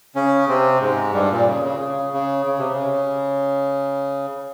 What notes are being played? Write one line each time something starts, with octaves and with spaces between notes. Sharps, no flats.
C#3 C#4
C3 C4
G#2 G#3
G2 G3
A#2
C#3
C#3
C#3
C#3
C#3
C3
C#3